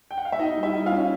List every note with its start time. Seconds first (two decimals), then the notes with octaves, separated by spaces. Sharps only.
0.11 G5
0.18 F#5
0.25 F5
0.32 E5
0.39 B2 D#4 D#5
0.57 G3
0.63 E4 E5
0.75 G3
0.86 F4 F5
0.92 C#4